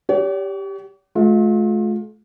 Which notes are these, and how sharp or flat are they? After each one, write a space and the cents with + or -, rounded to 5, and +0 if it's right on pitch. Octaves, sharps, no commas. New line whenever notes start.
G4 +0 C#5 +45 F#5 +45
A3 -45 F4 +30